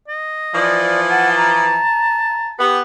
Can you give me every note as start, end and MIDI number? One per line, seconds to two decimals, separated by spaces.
0.08 0.90 75
0.54 1.79 52
0.54 1.79 53
0.54 1.01 74
1.10 1.30 78
1.10 2.64 81
1.37 2.47 82
2.59 2.80 59
2.59 2.79 67